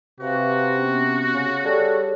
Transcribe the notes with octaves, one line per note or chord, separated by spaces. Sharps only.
C3 F#4 B4 F5
B3 C#4
C#3
G3 G#4 A4 C#5